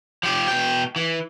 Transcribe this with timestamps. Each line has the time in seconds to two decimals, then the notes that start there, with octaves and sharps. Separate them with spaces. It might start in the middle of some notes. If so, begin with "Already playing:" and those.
0.23 F3 G4
0.48 B2 G5
0.96 E3